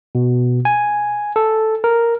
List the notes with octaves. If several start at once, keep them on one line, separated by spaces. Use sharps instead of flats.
B2
G#5
A4
A#4